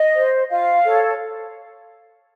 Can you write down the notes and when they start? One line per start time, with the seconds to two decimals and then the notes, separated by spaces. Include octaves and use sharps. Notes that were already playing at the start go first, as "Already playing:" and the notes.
Already playing: D#5
0.15 C5
0.50 F4 F5
0.84 A4 C#5